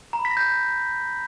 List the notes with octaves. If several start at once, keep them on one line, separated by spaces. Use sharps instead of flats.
A#5
B5
B6
A#6
G6